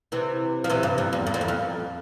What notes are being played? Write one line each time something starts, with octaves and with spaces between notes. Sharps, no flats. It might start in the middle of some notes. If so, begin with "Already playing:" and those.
C3 E3
F3
C3 E3
G2
F2
E2
G2
F2
E2
F2